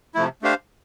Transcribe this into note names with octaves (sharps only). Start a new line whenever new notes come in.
C3 F3 A3 E4
A3 D4 G4 C5 F5